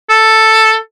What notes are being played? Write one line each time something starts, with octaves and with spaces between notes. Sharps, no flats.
A4